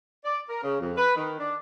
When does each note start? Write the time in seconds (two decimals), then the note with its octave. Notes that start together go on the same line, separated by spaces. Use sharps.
0.25 D5
0.49 A#4
0.63 C#3
0.80 F2
0.97 B4
1.16 D#3
1.38 D4